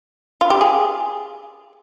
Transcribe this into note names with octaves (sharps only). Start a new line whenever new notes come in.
F4
G4
G#4